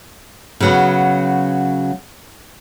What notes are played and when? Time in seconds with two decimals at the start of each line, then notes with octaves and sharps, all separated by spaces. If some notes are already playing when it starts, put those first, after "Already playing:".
0.60 C#3 F#3 B3